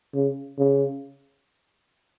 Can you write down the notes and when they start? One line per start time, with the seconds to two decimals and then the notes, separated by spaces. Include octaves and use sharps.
0.15 C#3
0.59 C#3